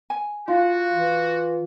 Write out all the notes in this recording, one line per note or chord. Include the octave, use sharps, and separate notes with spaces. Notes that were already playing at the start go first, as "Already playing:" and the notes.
G#5
F4 F#4
E3